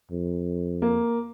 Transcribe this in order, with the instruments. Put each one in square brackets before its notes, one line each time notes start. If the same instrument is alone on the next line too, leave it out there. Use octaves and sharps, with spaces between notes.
[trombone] F2
[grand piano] A#3